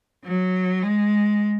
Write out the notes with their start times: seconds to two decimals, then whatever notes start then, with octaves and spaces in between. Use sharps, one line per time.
0.24 F#3
0.82 G#3